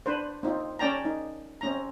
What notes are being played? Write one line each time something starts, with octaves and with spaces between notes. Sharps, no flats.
D4 B4 C5
C4 D#4 F4
C#4 D5 G5 A5 A#5
D#4
C4 C#4 A#5